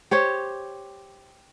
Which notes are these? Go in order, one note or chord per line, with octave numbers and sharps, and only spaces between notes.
G4 C5 C#5